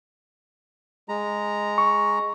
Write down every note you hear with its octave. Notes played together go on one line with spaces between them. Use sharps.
G#3 A#5
C#6